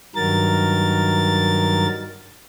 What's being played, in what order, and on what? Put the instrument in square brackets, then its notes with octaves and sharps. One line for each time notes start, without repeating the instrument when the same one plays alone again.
[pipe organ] G2 D#3 F#3 A#4 A6